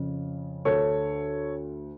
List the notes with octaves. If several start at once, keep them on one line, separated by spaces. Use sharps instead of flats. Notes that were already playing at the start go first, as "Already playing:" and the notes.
Already playing: F2 C#3
D2 D3 A4 C#5